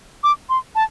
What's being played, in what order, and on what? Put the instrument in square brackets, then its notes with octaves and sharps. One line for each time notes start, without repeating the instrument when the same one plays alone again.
[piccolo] D6
C6
A5